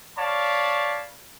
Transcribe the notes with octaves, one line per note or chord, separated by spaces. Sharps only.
C#5 D5 F5 A5 B5